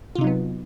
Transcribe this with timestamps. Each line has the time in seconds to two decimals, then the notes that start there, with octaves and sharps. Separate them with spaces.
0.15 F4
0.18 C3
0.21 D#4
0.24 F#3
0.27 B3